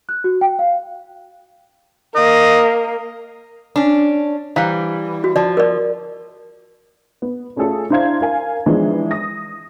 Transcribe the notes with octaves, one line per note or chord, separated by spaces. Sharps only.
F#6
F#4
G5
F5
A#3 D#5
C#4 D4
E3 G3 C5 F5 A#5
F#4
F3 D5 A5
A#4 D5
B3
A3 C#4 F4 G#4 A4
D4 E4 C5 F5 A#5 G#6
A#4 F5 G#5
E3 F3 G#3 B3 D4 D#4
D#6 A#6